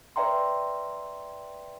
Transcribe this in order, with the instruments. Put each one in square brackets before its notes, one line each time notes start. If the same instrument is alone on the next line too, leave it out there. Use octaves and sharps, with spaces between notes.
[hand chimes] B4 D5 E5 G5 A#5 C6